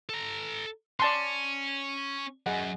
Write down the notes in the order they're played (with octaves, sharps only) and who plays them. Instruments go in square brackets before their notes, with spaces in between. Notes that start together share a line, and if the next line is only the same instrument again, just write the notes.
[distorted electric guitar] A4 A#5
[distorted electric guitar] C#4 [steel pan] D5 A5 C6
[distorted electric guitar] F#2 [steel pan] G#4 D#5 F#5